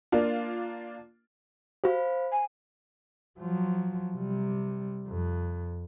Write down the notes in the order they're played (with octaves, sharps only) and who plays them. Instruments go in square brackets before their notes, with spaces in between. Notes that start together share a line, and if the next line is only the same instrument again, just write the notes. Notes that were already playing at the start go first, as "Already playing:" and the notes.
[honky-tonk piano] A#3 D4 F4
[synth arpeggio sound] F#4 G4 [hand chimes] C5 F5 B5
[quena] G#5
[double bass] F3 F#3
C3 G3
F2